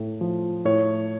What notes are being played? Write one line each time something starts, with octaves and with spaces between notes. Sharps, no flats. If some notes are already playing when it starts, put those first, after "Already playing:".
Already playing: A2
F3
A2 C#5